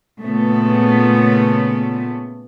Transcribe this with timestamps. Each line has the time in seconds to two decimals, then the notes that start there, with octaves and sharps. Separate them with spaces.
0.20 A#2 C#3 A3 B3